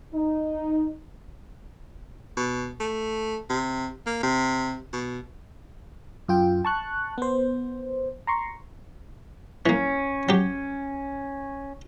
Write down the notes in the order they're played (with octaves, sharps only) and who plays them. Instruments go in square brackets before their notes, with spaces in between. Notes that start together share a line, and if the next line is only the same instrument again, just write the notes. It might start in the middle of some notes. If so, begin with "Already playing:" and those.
[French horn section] D#4
[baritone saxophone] B2
A3
C3
A#3
C3
B2
[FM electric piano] F#2 F4 G5
A5 C#6 F#6
B3 C5
A#5 C6 C#6
[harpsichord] E3 A#3 [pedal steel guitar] C#4
[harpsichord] F#3 G4